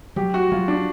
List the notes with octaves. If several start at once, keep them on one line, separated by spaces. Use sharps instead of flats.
F#3 G4
F#4
F#3 F4
D4